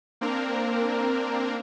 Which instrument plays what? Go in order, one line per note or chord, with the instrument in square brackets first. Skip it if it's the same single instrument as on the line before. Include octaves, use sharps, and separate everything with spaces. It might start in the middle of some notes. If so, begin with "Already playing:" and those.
[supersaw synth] A#3 C4 D4 A#4